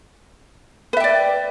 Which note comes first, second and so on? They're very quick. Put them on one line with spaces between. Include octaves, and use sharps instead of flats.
B4 E5 G5 D5